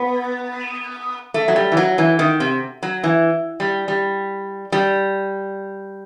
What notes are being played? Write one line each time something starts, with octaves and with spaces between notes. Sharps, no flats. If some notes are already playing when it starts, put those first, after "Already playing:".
Already playing: B3
A3
F#3
G3
E3
F#3
E3
D#3
C3
F#3
E3
G3
G3
G3